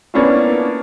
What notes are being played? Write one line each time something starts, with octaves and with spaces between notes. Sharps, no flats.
A#3 B3 C#4 D4 E4 F4